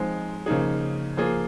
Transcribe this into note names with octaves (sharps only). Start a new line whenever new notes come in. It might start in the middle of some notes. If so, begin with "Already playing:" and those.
Already playing: F3 G#3 C4 D#4
C#3 F3 A#3 D#4 G#4
F3 A#3 F4 G#4